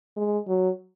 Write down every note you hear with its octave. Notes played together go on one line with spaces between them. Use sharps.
G#3
F#3